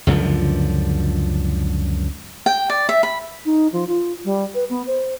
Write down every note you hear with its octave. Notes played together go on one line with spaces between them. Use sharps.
C#2 F#2 D3 F3
G5
D5
E5
B5
D#4
F3
F4
G3
B4
B3
C5